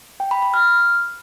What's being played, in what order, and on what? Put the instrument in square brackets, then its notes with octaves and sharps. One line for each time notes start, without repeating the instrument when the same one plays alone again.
[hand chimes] G5
B5
B5
F6